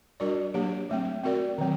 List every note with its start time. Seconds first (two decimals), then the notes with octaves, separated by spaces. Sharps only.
0.20 G3 D4 F#4 A#4 D5
0.54 F#3 A#3 D4 G4
0.90 F#3 A3 C4
1.24 C4 F#4 A#4 D5
1.58 D#3 F#3 C4